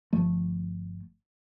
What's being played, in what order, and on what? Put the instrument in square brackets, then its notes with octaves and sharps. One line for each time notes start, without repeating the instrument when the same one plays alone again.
[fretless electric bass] G1 F3 A3